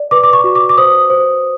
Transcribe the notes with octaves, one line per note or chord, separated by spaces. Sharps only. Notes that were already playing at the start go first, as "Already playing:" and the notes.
Already playing: D5
B4 D6
D6
C#6
F#4
D6
D6
C5 D#6
C5